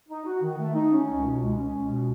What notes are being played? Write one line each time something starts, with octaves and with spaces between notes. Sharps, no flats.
D#4
F#4
D#3
A3
D#4
C#4
C#2
B2
G#3
C#4
C#2
B2